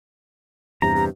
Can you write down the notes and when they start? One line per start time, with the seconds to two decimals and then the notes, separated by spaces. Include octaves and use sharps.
0.82 E2 G2 C3 G4 A#5
0.96 G4